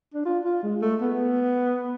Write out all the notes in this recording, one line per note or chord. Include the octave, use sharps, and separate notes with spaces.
D4
F4
F4
G#3
A3
B3